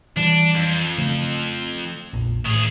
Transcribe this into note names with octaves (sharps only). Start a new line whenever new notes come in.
E3 G3 D4
F2
C#3 F3 A3
F1 A#1
A2 D#3 G#4